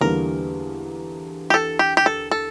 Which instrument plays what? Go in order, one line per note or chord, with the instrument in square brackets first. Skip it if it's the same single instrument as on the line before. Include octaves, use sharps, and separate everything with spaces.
[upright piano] E2 D3 G3 A#3 [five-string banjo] A#4
[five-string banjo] G4
A4
G4
G4
A4
A4